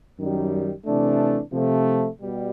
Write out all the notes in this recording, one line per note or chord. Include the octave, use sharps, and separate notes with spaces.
F#2 D#3 G3
C3 E3 A3 D4
C3 F3 A3
B2 G3